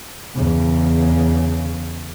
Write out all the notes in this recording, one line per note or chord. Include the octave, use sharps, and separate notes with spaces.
E2 C#3